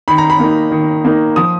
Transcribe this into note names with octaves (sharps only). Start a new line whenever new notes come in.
D#3 B5
A#5
B5
A#3 D#4
D#3
A#3 D#4
F3 D#6